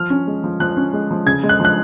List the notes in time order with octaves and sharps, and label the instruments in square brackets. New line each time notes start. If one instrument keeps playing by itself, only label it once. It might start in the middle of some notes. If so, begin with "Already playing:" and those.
Already playing: [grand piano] F3 F6
C#4
G#3
F3
F3 F#6
C#4
G#3
F3
C#3 G#6
G#3
F#6
F3 F#6